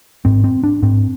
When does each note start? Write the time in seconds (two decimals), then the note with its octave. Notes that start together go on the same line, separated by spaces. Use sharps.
0.25 G#2 C4
0.44 C4
0.64 D4
0.83 G#2 C4